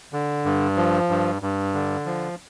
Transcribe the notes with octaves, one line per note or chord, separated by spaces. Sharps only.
D3
G2
F3
G2
G2
D3
F3